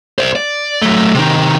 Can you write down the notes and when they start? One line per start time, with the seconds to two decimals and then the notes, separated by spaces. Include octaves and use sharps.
0.18 C5 D5
0.36 D5
0.82 F#3 A3
1.14 C3 D#3